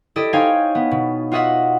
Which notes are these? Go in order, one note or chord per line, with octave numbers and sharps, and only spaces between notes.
E4 G4 A4 D5 D#5
D#4 C5 C#5 F5 G5 G#5
B3
B2
F4 F#4 D#5 E5 F#5